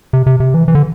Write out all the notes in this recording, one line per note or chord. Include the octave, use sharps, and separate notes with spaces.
C3
C3
C3
E3
E3
D3